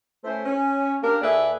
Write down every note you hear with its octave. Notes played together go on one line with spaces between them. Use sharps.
A3 C#4 E4 C5
C#4
A#3 D4 G4 A#4
D#2 G#4 A4 B4 D5 E5